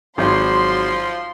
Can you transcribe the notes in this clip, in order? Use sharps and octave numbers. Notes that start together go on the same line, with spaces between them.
G#1 F3 F#3 C6